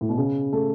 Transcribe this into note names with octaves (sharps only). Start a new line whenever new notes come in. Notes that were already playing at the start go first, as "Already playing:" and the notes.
A2
B2
C#3
A3